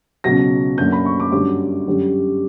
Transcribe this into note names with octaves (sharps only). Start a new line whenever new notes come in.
C#2 B2 F#3 A#6
F#2 D3 A#3 G6
B5
C#6
D6
G2 D3 F#3 C#4 D6
F#2 D3 G3 C#4